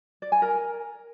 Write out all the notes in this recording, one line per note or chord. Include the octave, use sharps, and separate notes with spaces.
D5
G#5
A#4